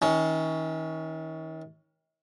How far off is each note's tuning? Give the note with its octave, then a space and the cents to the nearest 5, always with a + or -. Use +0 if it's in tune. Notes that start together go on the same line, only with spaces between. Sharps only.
D#3 +45 C#4 +10